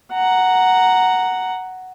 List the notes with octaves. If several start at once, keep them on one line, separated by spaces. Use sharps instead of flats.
F#5 A#5